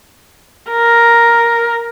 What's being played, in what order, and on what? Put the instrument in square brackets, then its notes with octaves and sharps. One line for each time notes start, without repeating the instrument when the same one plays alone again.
[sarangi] A#4